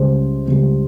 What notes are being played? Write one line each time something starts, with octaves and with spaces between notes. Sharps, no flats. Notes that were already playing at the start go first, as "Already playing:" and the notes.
Already playing: C#2 C#3 G3 C5
C#2 C#3 G3